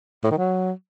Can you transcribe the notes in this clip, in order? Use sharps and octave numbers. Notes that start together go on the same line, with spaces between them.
A2
D#3
F#3